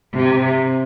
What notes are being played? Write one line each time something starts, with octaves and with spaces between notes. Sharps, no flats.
C3